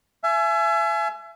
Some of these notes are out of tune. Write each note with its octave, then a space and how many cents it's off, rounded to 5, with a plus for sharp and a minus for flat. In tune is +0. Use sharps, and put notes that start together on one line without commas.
E5 +35 G#5 +30